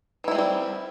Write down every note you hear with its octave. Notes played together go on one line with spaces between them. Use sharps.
E3 G3 G#3 C4 E4